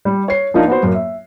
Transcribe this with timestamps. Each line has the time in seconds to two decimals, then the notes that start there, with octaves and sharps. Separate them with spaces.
0.05 G3
0.28 C#5 C7
0.54 F3 A#3 D4 D#4 F4
0.68 B3 F#4 C5
0.83 F#2 A#3
0.94 E5